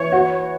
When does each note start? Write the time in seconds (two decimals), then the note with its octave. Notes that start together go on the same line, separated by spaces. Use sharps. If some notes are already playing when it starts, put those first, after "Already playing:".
Already playing: E3 C#5
0.12 F#4